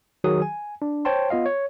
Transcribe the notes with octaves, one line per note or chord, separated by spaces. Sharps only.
D#3 F#3 F#4 G#4 D#6
G#5
D4
C5 C#5 G5 A5 C6
B3 F4 D#5 F5
C#5